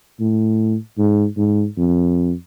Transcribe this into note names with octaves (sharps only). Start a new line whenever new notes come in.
A2
G#2
G#2
F2